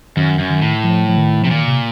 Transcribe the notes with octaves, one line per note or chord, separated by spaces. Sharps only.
F#2 D#3
F#2
D#3
A2
F3
F3
D#3
C3 F3
A#2 D#3
C3